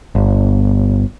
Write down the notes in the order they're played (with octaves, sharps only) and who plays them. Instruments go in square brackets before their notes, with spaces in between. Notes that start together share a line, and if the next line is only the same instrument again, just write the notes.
[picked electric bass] G1